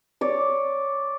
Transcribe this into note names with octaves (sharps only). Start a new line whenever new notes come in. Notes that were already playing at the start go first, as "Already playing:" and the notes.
C#5 D5